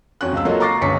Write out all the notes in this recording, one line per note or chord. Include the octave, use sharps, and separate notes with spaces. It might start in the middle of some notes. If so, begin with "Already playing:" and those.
F2 C#4 F#4 F#6
C#2 C4 F5 E6
F#3 A#3 F4 F#4 A4 D#5
A#5 C#6 D6 A6 A#6 C7
G1 C#2 C#4 C#6 B6 C#7